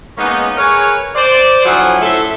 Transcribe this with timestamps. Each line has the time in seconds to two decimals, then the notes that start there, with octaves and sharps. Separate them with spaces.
0.17 G#3 A#3 B3 C#4 D#4
0.57 G#4 A#4 B4 C#5
1.15 C5 D5
1.65 D3 F3 F#3 E4 F#5 G#5
2.00 F#2 A2 A4 C5 E5